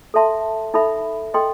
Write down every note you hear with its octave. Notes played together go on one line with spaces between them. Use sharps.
A4 E5 A5 C6
D#4 A4 E5 B5
A4 D#5 G5 C6